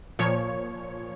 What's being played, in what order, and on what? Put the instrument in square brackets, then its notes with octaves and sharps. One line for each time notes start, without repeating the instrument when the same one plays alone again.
[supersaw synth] A#2 F3 C#5